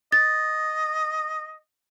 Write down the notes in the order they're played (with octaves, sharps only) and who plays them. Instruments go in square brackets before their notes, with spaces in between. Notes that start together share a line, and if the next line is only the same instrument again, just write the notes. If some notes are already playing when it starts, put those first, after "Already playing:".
[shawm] D#5 [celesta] A6